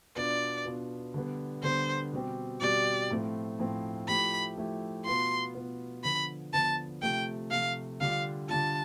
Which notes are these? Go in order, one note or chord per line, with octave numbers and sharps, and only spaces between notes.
B2 B3 D4 F4 D5
B2 B3 D4 F4
D3 G3 B3
D3 G3 B3 C5
B2 G3 C4 G4
B2 G3 C4 G4 D5
A2 F3 A3 C4 F4
A2 F3 A3 C4 F4
F3 A3 E4 G4 B5
F3 A3 E4 G4
B2 B3 F4 C6
B2 B3 F4
D3 F3 B3 B5
D3 F3 B3 A5
C3 F3 A3 G5
C3 F3 A3 F5
D3 G3 D4 F4 F5
D3 G3 D4 F4 A5